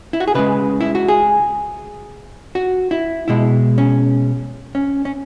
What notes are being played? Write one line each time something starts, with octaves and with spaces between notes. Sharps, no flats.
E4
F#4
G#4
C#3 G#3 B4
E4
F#4
G#4
F#4
E4
B2 G#3 E4
C#4
C#4
C#4